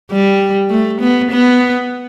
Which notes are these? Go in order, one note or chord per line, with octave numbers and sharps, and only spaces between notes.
G3
A3
B3
B3